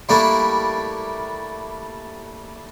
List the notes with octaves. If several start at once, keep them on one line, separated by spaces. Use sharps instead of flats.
G3 A3 A#3 D4 E4